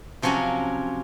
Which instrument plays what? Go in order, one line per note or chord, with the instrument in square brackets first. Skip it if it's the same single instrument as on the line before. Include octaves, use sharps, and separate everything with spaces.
[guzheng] C3 F3 F#3 C#4 A#4 F#5